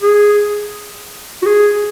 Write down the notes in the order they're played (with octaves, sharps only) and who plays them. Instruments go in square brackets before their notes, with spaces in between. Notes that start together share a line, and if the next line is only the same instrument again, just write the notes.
[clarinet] G#4
F#4
G#4